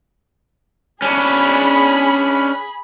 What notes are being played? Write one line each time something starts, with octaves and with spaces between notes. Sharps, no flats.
C#4 D4 G#4 B5